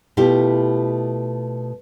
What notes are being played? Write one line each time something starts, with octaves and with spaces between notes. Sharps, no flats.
B2 A3 E4 F4 G4